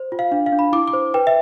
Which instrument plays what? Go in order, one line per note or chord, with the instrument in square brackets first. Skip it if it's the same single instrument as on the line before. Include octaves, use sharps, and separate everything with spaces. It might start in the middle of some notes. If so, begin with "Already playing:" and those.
Already playing: [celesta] C5
F4
F5
D4 F5
F5
D4
B5
E4 D6
D6
C5
B4 G5
E5